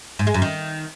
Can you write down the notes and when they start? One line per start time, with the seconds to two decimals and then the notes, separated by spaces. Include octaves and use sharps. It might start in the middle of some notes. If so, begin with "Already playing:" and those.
0.19 G#2
0.27 G#3
0.34 F#2
0.42 D#3